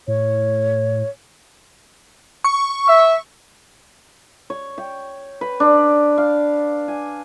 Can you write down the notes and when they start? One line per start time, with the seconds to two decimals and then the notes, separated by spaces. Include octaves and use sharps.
0.08 A2 C#5
2.44 C#6
2.88 E5
4.50 C#5
4.78 G5
5.41 B4
5.60 D4
6.18 F5
6.88 G#5